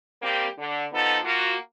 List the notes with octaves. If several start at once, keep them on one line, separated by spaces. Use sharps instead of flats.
G3 A#3 C4 G4
D3
F3 B3 D#4 A4
A#3 F4 F#4